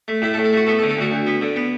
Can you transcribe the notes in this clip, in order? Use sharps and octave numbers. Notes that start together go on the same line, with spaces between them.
A3
A2 E4
A4
A2
A4
A3 F#4
B3 A4
A4
D3
A4
D2 F#4
D2
B3
D3
B3